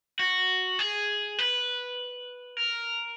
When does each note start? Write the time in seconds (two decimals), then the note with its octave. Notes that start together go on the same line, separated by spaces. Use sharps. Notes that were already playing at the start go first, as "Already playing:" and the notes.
0.19 F#4
0.79 G#4
1.39 B4
2.57 A#4